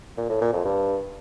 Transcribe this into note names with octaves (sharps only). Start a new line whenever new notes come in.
A#2
A2
A#2
F2
G2